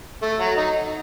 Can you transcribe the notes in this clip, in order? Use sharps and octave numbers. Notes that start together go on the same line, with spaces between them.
A3
F#3
D#4